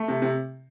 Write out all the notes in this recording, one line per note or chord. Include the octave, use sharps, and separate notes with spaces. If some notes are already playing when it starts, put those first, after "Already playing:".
Already playing: A3
C3
C3